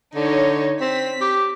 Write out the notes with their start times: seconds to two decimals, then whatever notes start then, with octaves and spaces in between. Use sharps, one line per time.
0.15 D3 D#4 C#5
0.81 C4 B6
1.21 G4